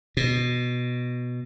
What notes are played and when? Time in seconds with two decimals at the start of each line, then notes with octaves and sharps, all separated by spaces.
0.17 B2